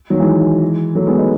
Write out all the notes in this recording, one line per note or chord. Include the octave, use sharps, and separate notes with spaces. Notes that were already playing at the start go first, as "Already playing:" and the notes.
D#3 F#3
E3 G#3
F#3 A3
G#3 B3
B3 D#4